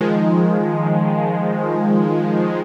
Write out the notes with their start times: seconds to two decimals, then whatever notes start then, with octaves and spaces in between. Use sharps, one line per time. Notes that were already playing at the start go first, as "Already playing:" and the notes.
0.01 D#3 F3 G#3